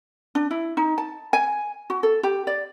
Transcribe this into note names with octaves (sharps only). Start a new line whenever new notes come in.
D4
E4
D#4
A5
G#5
F#4
A4
G4
D5